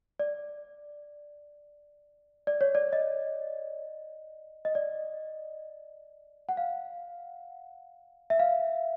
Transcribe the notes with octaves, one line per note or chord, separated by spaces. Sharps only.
D5
D5
C#5
D5
D#5
D#5
D5
F#5
F5
E5
F5